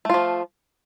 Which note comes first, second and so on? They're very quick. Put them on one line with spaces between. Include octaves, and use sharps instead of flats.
A3 F4 F3